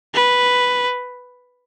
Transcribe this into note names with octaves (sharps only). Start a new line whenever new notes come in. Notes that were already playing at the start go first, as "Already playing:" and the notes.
B4